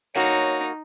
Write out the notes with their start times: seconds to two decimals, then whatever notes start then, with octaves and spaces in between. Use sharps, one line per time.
0.15 A#3 D#4 F#4 C#5